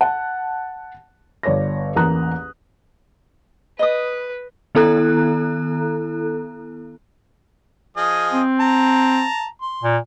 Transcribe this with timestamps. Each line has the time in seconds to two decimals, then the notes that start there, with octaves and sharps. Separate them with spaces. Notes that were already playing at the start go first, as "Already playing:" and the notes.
0.01 F#5 A5
1.43 G1 C#5 D5 A#6
1.96 A1 E2 A#3 A#5 D#6 F#6
3.79 B4 D#5 D#6
4.75 D#3 B3 E4 A4 A#5 F#6
7.97 F3 G#4 D#5
8.33 C4
8.60 A5 A#5
9.62 C6
9.84 A#2